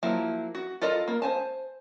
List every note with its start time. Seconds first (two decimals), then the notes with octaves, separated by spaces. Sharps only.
0.03 F3 F#3 A#3 E4
0.55 F#4
0.81 F4 A4 A#4 D#5
1.08 A#3
1.22 C5 G#5 A5